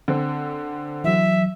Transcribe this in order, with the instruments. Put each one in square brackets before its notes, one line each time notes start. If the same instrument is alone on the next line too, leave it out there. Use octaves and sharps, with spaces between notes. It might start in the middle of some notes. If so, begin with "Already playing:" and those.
[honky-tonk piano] D3 C4
[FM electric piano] E3 F#3 [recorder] E5